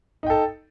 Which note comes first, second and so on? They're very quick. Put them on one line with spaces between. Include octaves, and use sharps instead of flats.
D#4 G5 A4